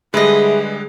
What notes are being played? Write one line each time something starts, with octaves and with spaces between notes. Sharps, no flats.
D3 G3 G#3 G#4 B4 D#5 E5